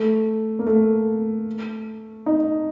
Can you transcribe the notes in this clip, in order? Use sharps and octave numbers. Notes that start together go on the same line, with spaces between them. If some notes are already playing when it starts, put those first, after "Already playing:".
Already playing: A3
A#3
A3
D#4